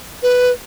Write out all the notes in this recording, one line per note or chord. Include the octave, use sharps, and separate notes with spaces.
B4